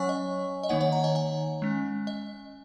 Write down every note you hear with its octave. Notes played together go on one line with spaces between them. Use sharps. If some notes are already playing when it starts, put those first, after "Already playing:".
Already playing: F#3 C#4 C#5 F#5 G#5 C#6
D#5
D#5
D#3 A#3 D#4 C#5 F#5
C#5 F#5
F#5 A#5
D#5 G#5
D#5 G#5
G#3 C#4
D#5